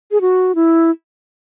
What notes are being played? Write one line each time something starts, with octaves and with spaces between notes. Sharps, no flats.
G#4
F#4
E4